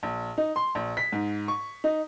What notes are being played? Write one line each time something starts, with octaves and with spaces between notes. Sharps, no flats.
A#1
D#4
C6
A#1
B6
G#2
C#6
D#4